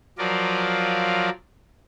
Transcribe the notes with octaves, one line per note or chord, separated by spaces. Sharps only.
F3 F#3 F4 A#4 D5